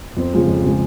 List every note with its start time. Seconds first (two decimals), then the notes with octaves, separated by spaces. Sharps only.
0.17 F2 C4
0.33 C#3 F3 G#3
0.48 F2
0.65 C#3 F3 G#3